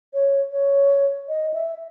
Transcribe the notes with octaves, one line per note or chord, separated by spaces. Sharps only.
C#5
C#5
D#5
E5